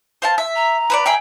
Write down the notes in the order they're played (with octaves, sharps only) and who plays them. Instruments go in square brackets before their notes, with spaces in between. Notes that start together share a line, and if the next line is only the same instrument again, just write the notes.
[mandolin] C5 F5 A5
E5
[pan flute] A#5
[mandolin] B4 C5 D5
G#4 E5 G5